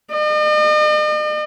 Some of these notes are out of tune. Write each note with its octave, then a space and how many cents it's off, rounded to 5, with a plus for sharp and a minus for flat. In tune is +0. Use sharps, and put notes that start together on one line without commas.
D#5 -45